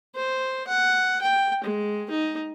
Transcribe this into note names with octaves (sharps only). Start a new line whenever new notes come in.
C5
F#5
G5
G#3
D#4